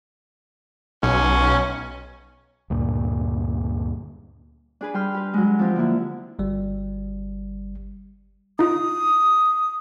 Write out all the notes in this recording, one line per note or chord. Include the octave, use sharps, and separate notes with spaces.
B1 C#4
D2 G2 A#2
D4 G#4 B4
G3 G5 C6 F6
G4 B4
F#3 G#3
F3 C4 G4
D3 A#3 E4
G1 G3
D#4 F4 D#6